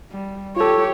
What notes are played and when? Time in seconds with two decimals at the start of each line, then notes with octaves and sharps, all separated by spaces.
0.11 G3
0.56 F4 G4 A4 C#5